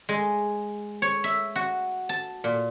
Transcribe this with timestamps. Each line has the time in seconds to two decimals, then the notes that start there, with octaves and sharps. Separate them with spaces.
0.09 G#3
1.02 C#5
1.24 E5
1.56 F#4
2.09 A5
2.44 A#2